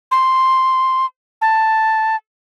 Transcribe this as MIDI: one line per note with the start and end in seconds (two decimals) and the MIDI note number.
0.11 1.06 84
1.42 2.16 81